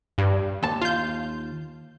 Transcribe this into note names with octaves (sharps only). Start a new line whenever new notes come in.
G2
D#2 A5
F4 G6